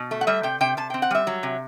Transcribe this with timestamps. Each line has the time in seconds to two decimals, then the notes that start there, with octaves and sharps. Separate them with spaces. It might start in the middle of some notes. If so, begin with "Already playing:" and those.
Already playing: B2
0.11 A3
0.21 F#5
0.27 G3 E5
0.43 C3 G5
0.61 C3 G5
0.77 C3 A5
0.90 G5
0.94 C4
1.02 F#5
1.11 G3 E5
1.27 F#3
1.43 C3